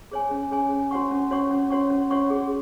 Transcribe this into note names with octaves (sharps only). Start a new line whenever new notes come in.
G#4 C#5 G#5
C#4
G#4 C#5 G#5
C#4
F#4 C#5 F#5 C#6
C#4
F#4 C#5 F#5 C#6
C#4
F#4 C#5 F#5 C#6
C#4
F#4 C#5 F#5 C#6
G#4